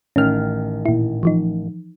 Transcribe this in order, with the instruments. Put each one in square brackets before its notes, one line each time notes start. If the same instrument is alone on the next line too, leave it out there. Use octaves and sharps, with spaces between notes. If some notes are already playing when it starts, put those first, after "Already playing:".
[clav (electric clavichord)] A1 D#3 G5 [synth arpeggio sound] C#4 F6
[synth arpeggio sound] A#2 E4
E3 F3 D#4